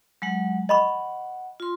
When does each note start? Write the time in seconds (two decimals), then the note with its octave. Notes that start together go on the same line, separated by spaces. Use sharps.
0.22 F#3 G#3 F#5
0.69 D#5 F#5 B5 C#6
1.60 F4 C6